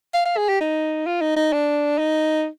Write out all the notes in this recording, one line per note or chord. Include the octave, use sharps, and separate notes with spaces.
F5
F5
G#4
G4
D#4
F4
D#4
D#4
D4
D#4